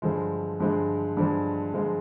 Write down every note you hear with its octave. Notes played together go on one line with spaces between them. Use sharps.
G2 D3 F3 G#3
G2 D3 F3 G#3
G2 D3 F3 G#3
G2 D3 F3 G#3